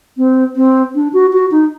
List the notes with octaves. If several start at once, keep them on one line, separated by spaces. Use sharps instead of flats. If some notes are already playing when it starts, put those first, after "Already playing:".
C4
C4
D4
F#4
F#4
D#4